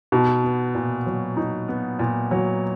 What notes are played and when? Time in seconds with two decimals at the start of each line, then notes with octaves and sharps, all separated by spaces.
0.12 B2 D#4
0.44 B3
0.75 A#2
1.06 F#3
1.37 D#4
1.69 B3
1.99 A#2
2.31 F#3